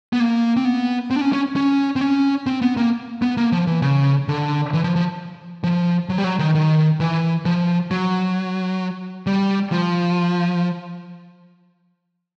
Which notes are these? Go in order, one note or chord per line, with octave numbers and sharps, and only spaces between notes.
B3
A#3
C4
B3
C4
D4
C#4
C#4
C#4
C4
C#4
C4
B3
A#3
B3
A#3
F3
E3
C#3
D3
E3
F3
F3
F3
F#3
G3
F#3
D#3
D#3
E3
F3
F#3
G3
F3